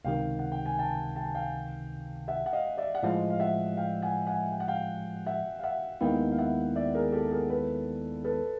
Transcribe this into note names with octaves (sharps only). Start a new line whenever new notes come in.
C#2 C3 D#3 F5 G5
F#5
G5
G#5
G5 A5
G5 A5
F5 G5
E5 F#5
F#5
D#5 F5
D5 E5
F#5
A2 F3 G#3 D#5 F5
F5
E5 F#5
F5 G5
F#5 G#5
F#5 G#5
G5
F#5
F5 G5
E5 F#5
F5
E5 F#5
D#2 D#3 G#3 B3 E4 F5 G5
F5
E5 F#5
D5 E5
G#4 A#4
G4 A4
G#4 A#4
A4 B4
A4 B4